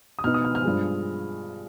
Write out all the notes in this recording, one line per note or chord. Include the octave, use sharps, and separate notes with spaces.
D#6
B2 B3 D#4 F6
D#6
F6
F6
G2 F3 G#3